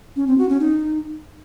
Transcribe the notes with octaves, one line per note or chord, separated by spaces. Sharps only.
C#4
C4
F#4
C#4
D#4